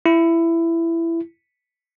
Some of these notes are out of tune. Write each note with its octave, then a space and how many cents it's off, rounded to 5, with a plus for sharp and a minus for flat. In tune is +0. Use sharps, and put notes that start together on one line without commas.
E4 +15